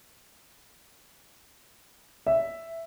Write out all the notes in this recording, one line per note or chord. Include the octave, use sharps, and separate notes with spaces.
E5